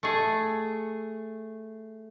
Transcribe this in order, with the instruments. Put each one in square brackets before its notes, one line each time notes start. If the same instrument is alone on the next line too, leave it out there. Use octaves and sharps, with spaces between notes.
[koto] A3 G#4